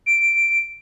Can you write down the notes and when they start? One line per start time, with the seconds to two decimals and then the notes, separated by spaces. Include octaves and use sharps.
0.06 D7